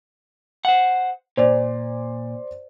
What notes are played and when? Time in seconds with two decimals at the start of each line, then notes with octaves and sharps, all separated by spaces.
0.65 C5 F#5
1.37 A#2 C5 D5